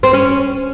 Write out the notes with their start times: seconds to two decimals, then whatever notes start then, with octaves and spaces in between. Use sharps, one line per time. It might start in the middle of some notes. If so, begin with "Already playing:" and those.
0.03 C4
0.13 C#4